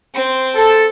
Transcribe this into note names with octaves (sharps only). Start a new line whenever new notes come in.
C4 C6
A4